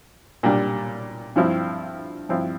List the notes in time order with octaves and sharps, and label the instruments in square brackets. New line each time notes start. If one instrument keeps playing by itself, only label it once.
[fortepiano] A#2 G3 D4
G2 F3 C4 E4
G2 F3 C4 E4